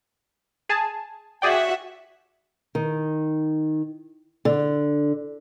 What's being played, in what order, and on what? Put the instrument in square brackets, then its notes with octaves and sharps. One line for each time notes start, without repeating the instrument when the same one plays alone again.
[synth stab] G#4 G#5 A5
[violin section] F#4 E5 F#5 [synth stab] G#4 D5 G5
[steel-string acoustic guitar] D#3
D3